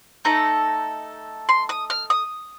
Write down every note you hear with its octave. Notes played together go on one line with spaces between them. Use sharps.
A3 D#4 A4 A#5
C6
D#6
F6
D#6